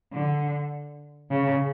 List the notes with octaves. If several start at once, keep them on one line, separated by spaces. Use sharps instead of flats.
D3
C#3